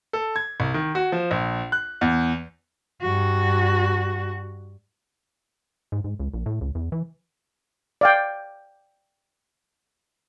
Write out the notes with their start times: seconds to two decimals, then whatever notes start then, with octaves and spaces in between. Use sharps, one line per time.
0.13 A4
0.36 G#6
0.60 C2
0.74 D#3
0.95 F#4
1.12 F3
1.31 A#1
1.72 F#6
2.01 E2
3.02 G2 F#4
5.92 G#2
6.04 G#2
6.20 C#2
6.34 A#1
6.46 A2
6.61 C#2
6.75 E2
6.92 E3
8.01 D5 F5 G5